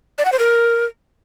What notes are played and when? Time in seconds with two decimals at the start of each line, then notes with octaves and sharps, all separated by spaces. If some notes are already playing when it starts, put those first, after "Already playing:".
0.18 D5
0.25 F#5
0.32 C5
0.39 A#4